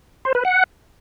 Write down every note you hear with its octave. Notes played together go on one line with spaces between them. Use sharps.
C5
B4
F#5